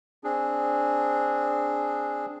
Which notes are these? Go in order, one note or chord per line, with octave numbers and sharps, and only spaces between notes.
C4 D4 G#4